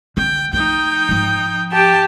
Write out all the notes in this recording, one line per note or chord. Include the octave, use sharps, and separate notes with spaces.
D3 G5
F3 A3 D#4 G5
G#2 F3
G4 A5